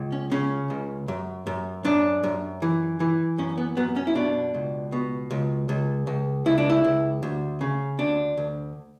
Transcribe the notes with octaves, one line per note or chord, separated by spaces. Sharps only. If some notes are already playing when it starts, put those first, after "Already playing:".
Already playing: C#2
C#4
C#3 C#4
C#2
F#2
F#2
F#2 D4
F#2
E3
E3
F#2 C#4
B3
F#2 B3
C#4
E4
B2 D4
C#2
B2
C#2
C#2
C#2
C#2 E4
D4
E4
C#2
D2
C#3
D2 D4
D2